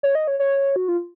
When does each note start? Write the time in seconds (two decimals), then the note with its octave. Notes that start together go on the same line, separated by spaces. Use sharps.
0.03 C#5
0.15 D#5
0.28 C#5
0.40 C#5
0.76 F#4
0.88 F4